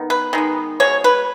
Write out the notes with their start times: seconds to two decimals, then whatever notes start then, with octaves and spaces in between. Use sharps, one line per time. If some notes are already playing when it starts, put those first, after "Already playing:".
Already playing: D#3 B3
0.10 B4
0.33 D#3 G#3 B3
0.80 B2 G#3 C#5
1.04 B4